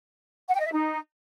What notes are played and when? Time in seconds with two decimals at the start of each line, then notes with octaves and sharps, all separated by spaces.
0.48 F#5
0.54 G5
0.60 D#5
0.66 E5
0.72 D#4